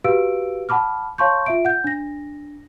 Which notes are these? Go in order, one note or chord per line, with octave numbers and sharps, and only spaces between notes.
F#4 G4 B4 F5 E6 D7
F#5 A5 B5 D6 F6
C#5 F5 A5 C6 C#6 G6
F4 E5 D7
F#5 G6
D4 A#6